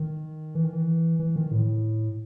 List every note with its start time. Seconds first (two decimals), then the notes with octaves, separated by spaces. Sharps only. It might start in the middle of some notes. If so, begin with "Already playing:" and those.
Already playing: D#3
0.55 E3
0.64 D#3
0.73 E3
1.19 E3
1.36 D#3
1.52 A2